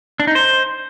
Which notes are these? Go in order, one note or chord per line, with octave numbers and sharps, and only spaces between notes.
D4
D#4
C5